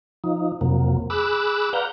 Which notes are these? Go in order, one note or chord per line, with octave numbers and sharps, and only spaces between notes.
F3 D#4
F2 C3 F#3 A#3
G#4 B5 D6 E6 F#6
B4 D5 F5 F#5 A#5 G6